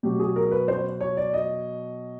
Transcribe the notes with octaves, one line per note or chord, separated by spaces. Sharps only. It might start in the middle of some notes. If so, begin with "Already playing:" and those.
B2 F#3 G4
G#4
A#4
B4
C5
C#5
D5
D#5